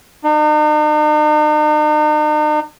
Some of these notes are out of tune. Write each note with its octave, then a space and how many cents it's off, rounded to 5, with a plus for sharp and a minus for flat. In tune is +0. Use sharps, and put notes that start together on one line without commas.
D#4 -45